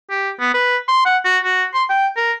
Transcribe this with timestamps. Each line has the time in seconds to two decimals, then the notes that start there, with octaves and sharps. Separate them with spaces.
0.10 G4
0.40 B3
0.54 B4
0.88 C6
1.05 F#5
1.25 F#4
1.44 F#4
1.74 C6
1.89 G5
2.17 A#4